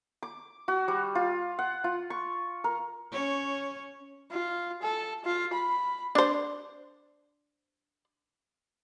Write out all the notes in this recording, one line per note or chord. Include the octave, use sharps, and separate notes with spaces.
D6
F#4
G3
F4
F#5
F4
C#6
A#4
C#4 C#5
F4
A4
F4
B5
D4 C5